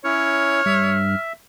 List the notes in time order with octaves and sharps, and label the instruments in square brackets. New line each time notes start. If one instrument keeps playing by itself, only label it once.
[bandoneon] C#4 E4 [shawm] C#5 [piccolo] F6
[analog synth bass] G2 [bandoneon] E5